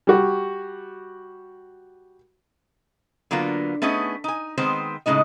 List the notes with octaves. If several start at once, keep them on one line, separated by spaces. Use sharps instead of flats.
G3 F#4
D3 F#3 A#3 B3 F4
A3 B3 C#4 D#4 G#4
D#4 G#5
D#3 G#3 B3 C4 C5
A2 C#3 G#3 D#4 D#5